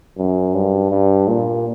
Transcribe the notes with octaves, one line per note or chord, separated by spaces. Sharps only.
F#2
G2
G2
A#2